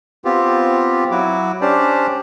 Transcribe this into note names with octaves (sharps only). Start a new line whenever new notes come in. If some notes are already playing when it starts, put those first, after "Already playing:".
B3 C4 F4 G4
F#3 E4 F#4 D6
C#4 D4 G4 C5 D5